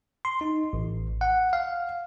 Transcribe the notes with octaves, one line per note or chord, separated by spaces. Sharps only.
C6
D#4
A1
F#5
F5